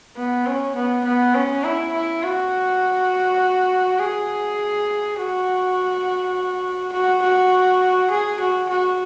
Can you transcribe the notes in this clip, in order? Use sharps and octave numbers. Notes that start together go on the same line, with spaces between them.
B3
C#4
B3
B3
C#4
E4
E4
F#4
G#4
F#4
F#4
F#4
G#4
F#4
F#4